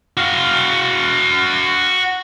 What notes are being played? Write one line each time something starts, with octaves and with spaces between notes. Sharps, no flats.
F#4 F5